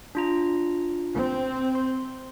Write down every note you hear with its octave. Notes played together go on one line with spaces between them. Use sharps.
D4 F4 A#5
C4
C6